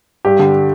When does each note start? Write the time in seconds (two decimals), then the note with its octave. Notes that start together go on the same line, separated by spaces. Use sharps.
0.25 G2 G4
0.39 D3